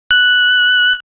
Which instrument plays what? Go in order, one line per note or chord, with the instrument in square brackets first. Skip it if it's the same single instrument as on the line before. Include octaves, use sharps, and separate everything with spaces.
[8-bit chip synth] F#6